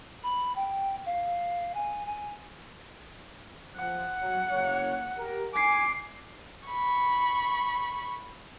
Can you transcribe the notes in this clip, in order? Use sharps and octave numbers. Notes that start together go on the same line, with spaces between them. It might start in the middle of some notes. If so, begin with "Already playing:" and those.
B5
G5
F5
G#5
G#5
F3 F#5
F#3
F#1 A#3 C#5
G4 A#4
G#5 D6 C7
B5 C#6